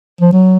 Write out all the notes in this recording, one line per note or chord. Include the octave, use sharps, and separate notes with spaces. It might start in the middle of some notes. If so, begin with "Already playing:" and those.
F3
F#3